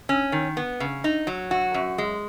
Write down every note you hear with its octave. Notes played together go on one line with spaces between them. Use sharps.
C#4
D#3
B3
C#3
D#4
F#3
F#4
F#2
G#3